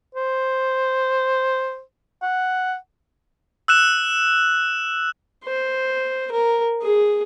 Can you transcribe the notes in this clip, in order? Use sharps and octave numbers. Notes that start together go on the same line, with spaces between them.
C5
F#5
E6 F#6 E7
C5
A#4
G#4